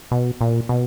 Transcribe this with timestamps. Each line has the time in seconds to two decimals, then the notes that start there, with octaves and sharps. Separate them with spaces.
0.11 B2
0.41 A#2
0.69 B2